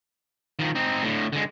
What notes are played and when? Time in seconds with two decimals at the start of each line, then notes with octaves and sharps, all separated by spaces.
0.59 D#3 F3
0.75 C4 D#4
1.03 A2 D3
1.33 D3 G#3